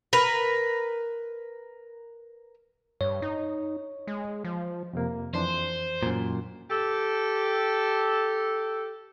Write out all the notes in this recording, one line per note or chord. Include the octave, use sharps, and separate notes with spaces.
A#4 B4
G2 C#5
D#4
G#3
F3
F2 C3 A#3
F2 E3 D4 C5
F#2 A#2
G4 A4